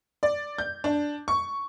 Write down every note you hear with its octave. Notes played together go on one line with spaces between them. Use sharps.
D5
G6
D4
C#6